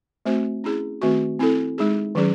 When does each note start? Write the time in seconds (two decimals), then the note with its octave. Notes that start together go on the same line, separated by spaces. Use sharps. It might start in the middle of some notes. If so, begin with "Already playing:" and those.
0.26 A3 C4 F#4 C5
0.64 C#4 E4 G#4
1.02 D#3 A3 C4 F#4
1.39 C4 E4 A4
1.78 G#3 D#4 G#4
2.15 D#3 F#3 C#4 G#4